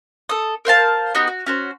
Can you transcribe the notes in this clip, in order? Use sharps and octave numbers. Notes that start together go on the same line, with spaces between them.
A4 D#6
A#4 C5 F5 A5
B3 D#4 F#4 G4
F#4
C#4 F#4 C5